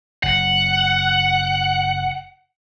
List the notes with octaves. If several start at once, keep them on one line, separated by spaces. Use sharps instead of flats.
F#1 F#5